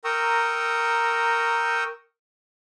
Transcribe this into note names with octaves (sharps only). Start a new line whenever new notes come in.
A#4 G5 A#5 C#6 D#6 E6